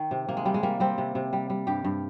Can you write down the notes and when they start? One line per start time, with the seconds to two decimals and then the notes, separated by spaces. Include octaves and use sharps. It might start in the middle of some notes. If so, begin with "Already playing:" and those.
Already playing: D#3
0.11 C3
0.28 C3 A#3
0.37 G#3
0.45 C3 G3
0.54 G#3
0.63 G3 A#3
0.80 G3 C4
0.98 C3
1.15 C3
1.33 G3
1.50 G3
1.67 G2 G4
1.84 G2